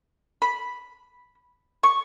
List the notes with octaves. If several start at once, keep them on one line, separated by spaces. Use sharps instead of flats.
B5
C#6